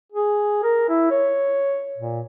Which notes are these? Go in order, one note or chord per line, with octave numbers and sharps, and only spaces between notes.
G#4
A#4
E4
C#5
A#2